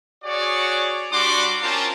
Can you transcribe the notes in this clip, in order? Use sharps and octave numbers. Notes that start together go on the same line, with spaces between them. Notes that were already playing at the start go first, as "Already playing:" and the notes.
F#4 G#4 C#5 D5
G3 D4 F#4 C6 D6
C4 C#4 F4 A#4 A5